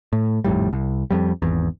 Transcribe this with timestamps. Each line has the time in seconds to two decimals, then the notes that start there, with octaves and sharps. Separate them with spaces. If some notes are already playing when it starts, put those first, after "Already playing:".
0.13 A2
0.44 G#1 F2 A2 G3
0.73 C2
1.11 F2 G3
1.42 G#1 E2